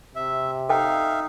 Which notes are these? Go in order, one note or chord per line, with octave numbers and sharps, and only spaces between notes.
C3 E5
D#4 A4 E5 F5 G5